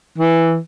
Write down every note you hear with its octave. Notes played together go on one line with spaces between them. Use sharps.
E3